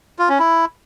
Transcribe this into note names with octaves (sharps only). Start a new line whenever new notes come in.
F4
C#4
E4